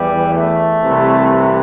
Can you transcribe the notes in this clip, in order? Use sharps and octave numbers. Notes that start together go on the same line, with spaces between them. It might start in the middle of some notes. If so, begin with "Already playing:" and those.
Already playing: E2 E3 G3
A3
C2 C3 E3